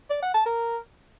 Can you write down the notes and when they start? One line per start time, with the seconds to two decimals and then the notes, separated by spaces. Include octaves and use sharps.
0.10 D5
0.22 F#5
0.34 A5
0.46 A#4